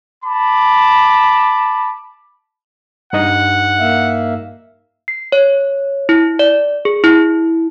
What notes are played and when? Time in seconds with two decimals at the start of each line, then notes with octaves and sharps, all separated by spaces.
0.24 A5 B5 D6
3.13 G2 D#4 D#5 F#5
3.80 A#3 E5 F5
5.08 C7
5.32 C#5
6.09 E4
6.39 D5
6.85 G#4
7.04 E4